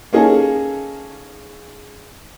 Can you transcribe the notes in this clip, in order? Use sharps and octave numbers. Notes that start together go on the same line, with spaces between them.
A#3 C#4 D#4 G#4 A4